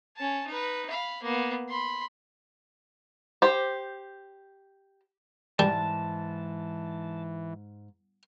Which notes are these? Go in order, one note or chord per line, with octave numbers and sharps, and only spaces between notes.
C#4 A5
D#4 B4
F5 B5
A#3 B3
B5 C6
G4 C5
G#2 E3 G3 A5